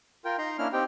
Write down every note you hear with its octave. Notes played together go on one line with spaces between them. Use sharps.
F4 A#4 G5
D#4 A#5 C6
A#3 C#4 D4 E4 F6
C4 D#4 G4 G5